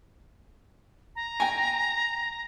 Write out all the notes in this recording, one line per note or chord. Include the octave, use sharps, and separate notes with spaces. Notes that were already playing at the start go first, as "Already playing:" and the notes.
A#5
G5 G#5